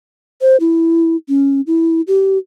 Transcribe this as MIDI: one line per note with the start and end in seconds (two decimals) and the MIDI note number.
0.41 0.57 72
0.60 1.16 64
1.29 1.61 61
1.67 2.01 64
2.07 2.38 67